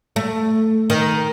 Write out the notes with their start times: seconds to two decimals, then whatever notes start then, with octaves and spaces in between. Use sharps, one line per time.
0.16 A3
0.90 D#3